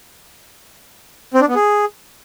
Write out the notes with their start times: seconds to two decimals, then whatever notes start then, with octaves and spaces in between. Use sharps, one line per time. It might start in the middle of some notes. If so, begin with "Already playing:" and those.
1.34 C4
1.41 D4
1.48 B3
1.55 G#4